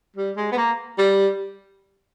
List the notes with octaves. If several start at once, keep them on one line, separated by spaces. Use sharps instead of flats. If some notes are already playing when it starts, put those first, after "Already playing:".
G3
G#3
B3
A#3
G3